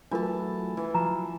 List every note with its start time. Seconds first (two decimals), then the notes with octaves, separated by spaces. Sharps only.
0.11 E3 F#3 A3 D4 F4 A#4 A5
0.77 E3
0.94 F3 F#3 A#5